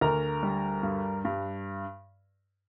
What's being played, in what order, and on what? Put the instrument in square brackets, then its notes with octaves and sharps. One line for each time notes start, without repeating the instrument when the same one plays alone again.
[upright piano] D2 A#4 A#5
G3
G2
G2